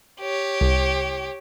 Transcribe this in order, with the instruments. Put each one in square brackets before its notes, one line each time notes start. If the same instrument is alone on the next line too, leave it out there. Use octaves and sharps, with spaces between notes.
[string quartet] G4 C#5
[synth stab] C2